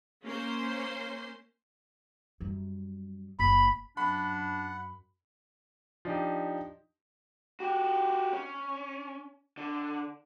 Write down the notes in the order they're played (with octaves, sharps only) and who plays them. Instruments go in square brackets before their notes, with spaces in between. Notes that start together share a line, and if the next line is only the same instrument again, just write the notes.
[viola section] A#3 C#4 C5 C6
[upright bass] F#2 G3
[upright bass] F#1 D3 [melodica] B5
[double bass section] F#2 [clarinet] D4 [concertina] F#5 [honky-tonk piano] B5
[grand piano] F3 D4 D#4 G4
[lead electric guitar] F#4 G4
C#4
D3